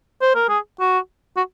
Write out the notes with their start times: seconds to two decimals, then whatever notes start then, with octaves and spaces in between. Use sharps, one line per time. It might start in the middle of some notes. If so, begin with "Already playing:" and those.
0.22 C5
0.35 A#4
0.49 G#4
0.80 F#4
1.37 F#4